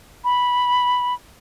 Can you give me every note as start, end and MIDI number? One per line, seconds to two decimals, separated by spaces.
0.24 1.14 83